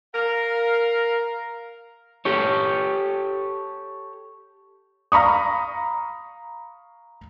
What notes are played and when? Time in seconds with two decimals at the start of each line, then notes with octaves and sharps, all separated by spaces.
0.15 A#4 F5
2.25 G4 A4 C#5
5.12 F5 A#5 B5 C#6 D#6